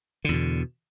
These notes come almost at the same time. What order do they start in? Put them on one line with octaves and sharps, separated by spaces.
D3 E2 B2